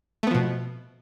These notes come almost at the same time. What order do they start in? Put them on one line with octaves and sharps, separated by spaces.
A3 B3 F3 B2